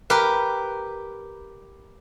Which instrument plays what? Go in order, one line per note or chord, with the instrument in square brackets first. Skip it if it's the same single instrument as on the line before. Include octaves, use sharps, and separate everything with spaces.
[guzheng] G4 A#4 B4